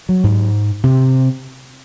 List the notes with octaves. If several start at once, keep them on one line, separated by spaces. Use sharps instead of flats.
F#3
G#2
C3